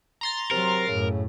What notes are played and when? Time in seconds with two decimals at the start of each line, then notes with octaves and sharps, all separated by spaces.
0.21 A#5 C6 A6
0.51 C3 F#3 A#4
0.88 F#2 A2 C#3